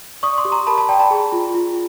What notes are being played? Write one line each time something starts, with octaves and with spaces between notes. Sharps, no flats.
D5 C#6 D#6
C6 D6
G4
A#5 C6
A#4 A5 B5
A5 B5
D5 G5 A5
A5 B5
G#4
F4
F4